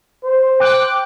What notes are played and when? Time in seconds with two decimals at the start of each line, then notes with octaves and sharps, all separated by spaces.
0.24 C5
0.60 G5 D6 F#6